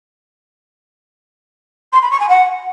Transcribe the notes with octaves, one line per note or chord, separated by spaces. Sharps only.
C6
B5
C#6
G#5
F#5